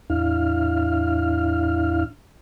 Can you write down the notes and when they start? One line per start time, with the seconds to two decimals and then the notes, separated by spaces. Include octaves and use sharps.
0.10 E2 A2 D4 E4 F5 F6